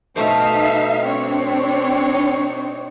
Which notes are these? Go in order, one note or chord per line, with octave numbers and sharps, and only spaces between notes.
B2 A3 D#4 C5 E5 F5
C4 D4 C#5
D#4